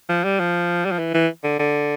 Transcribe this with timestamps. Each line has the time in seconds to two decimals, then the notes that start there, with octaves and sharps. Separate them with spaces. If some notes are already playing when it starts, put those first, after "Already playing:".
0.09 F3
0.24 G3
0.40 F3
0.85 G3
0.92 F3
0.99 E3
1.14 E3
1.44 D3
1.59 D3